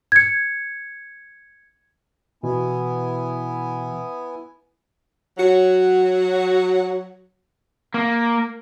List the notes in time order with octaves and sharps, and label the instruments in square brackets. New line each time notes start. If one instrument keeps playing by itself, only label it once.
[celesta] G#6 C#7
[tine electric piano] B2 E3 [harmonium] B3 E4 G#5
[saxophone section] F#3 F#4
[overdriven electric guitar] A#3